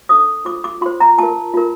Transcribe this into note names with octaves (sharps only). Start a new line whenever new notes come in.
D4 A4 C5 D#6
F4 C5 D6
D6
F4 C5 C6
A#5
F4 A#4 A5
F4 A#4